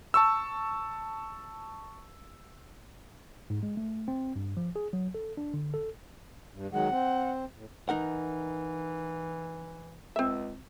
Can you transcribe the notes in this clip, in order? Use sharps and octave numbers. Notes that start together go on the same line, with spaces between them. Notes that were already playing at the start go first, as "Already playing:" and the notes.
A5 C#6 E6
G#2
G#3
A3
C4
G2
F3
G#4
F#3
A4
D4
D3
A4
G2
D#3 F#3 G#3 F#5
C4
A2
E3 D#4 A#4 F#5
C#2 C4 E5